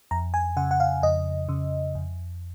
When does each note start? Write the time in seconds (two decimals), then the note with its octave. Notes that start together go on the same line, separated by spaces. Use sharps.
0.11 F2 A#5
0.34 G#5
0.57 C#3 F#5
0.71 F#5
0.80 F5
1.03 F2 D#5
1.49 C#3
1.95 F2